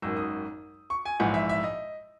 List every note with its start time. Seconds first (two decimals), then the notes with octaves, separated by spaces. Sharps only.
0.02 G#1 F#2 D#3 E6
0.17 D#6
0.90 C#6
1.05 G#5
1.19 A#1 G#2 E3 F#5
1.34 E5
1.49 E5
1.64 D#5